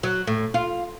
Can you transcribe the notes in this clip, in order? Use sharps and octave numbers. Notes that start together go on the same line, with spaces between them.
F#3
A2
F4